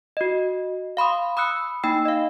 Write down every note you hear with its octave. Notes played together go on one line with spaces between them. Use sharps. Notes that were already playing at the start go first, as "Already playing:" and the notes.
F#4 D#5
F5 B5 C6 D#6
B5 D#6 E6 F#6 C#7
A#3 D#4 G5 B5 E6 C7
D#5 F5